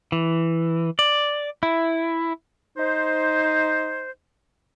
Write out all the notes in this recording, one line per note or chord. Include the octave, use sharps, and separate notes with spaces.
E3
D5
E4
D#4 C5